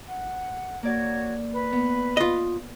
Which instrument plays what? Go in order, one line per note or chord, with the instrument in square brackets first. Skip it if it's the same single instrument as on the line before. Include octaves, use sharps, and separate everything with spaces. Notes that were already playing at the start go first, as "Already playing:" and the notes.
[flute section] F#5
[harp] A#3 D5 [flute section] F#4 C#5 G#6
[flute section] B4
[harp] B3
[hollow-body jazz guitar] F4 D#5